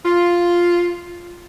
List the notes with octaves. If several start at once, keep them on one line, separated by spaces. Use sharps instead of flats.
F4